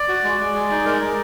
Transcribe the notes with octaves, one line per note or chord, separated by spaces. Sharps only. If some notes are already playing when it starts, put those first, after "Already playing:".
Already playing: D5
F#4
G#3
G#3
G#4
D#4
G#3 A#4
G#3